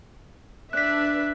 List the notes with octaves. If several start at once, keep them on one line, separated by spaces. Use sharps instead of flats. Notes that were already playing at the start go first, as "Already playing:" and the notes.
D4 B4 E5 F#6 B6